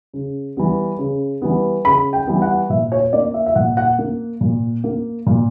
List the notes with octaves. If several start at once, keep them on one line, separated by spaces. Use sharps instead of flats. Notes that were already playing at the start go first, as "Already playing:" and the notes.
C#3
E3 G3 B3
C#3
E3 G3 B3
C#3 B5
G5
E3 G3 B3
F#5
A#2 E5
C#5
A#3 D5
E5
E5
A#2 F#5
F#5
A#3
A#2
A#3
A#2